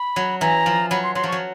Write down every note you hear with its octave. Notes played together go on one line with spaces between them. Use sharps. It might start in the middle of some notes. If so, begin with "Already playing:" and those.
Already playing: B5
F#3
E3 A#5
F3
F#3 B5
C6
F#3 C6
F3 C#6
F#3